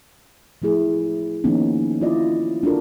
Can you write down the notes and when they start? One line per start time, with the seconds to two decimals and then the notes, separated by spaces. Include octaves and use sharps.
0.62 F3 A3 E4 G#4
1.44 D#3 F3 A#3 B3 C#4 D#4
2.01 E4 F4 D5 D#5
2.63 D4 F4 F#4 A4 A#4